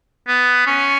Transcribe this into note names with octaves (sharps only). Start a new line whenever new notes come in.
B3
C#4